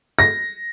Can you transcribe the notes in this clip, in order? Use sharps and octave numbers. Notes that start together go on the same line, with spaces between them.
A#6